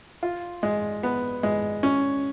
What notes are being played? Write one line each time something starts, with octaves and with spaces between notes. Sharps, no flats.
F4
G#3
B3
G#3
C#4